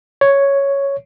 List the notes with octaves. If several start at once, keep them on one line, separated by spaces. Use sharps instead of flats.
C#5